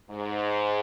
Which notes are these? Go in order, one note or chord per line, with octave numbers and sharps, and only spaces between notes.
G#2